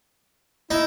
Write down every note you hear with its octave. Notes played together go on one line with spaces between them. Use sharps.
D#4 E4